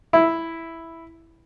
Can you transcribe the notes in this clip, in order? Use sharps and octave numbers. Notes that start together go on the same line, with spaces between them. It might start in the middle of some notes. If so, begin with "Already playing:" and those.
E4